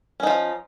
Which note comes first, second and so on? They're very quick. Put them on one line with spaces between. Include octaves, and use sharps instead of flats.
C#4 D#4 F3